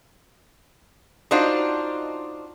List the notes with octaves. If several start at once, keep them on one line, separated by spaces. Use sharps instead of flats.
D4 D#4 F4 F#4 C5